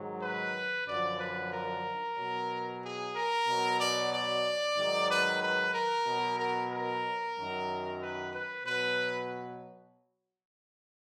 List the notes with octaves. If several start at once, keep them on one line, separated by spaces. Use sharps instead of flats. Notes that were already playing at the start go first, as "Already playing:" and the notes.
Already playing: G#2 D#3 F#3
B4
F#2 D3 F3 D5
B4
A#4
B2 F#3
G#4
A#4
B2 F#3
D5
D5
G#2 D#3 F#3
B4
B4
A#4
B2 F#3
A#4
A#4
F#2 D#3 F#3
B4
B4
B2 F#3 B4